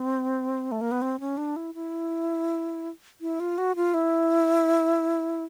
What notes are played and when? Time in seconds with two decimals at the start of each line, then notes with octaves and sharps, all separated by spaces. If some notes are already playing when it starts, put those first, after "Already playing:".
Already playing: C4
0.72 A3
0.81 A#3
0.91 B3
1.02 C4
1.20 C#4
1.37 D4
1.56 E4
1.75 E4
3.21 E4
3.40 F4
3.58 F#4
3.76 F4
3.94 E4